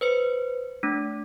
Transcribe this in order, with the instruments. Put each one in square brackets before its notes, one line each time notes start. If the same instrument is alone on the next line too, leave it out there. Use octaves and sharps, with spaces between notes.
[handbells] B4 C5 C#7
A3 D4